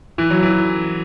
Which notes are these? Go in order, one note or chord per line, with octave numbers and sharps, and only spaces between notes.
E3
F#3
E3